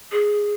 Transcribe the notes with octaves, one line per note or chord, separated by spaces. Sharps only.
G#4